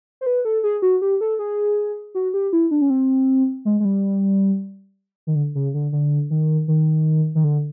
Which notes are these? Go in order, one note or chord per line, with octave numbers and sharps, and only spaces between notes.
C5
B4
A4
G#4
F#4
G4
A4
G#4
F#4
G4
E4
D4
C#4
C4
G#3
G#3
G3
D#3
D3
C#3
D3
D3
D#3
D#3
D#3
D3